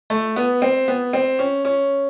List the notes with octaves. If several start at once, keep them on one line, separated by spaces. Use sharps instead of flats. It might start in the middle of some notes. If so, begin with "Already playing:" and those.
A3
B3
C4
B3
C4
C#4
C#4